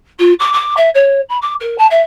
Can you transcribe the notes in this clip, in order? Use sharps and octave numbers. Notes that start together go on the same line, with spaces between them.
F4
D6
D6
E5
C#5
B5
D6
A#4
A5
E5